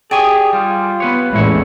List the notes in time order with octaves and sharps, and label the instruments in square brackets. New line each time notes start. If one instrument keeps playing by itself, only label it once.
[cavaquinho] G4 C#6 D6 [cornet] G#4 [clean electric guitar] D5 G#5
[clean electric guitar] G3 [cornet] F4
[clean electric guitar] B3 B4 C#5
[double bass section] A1 E2 [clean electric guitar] G#3 A3 C#5 [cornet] E4